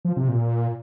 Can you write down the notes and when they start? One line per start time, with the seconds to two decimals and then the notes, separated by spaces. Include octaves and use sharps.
0.05 F3
0.17 C3
0.29 A#2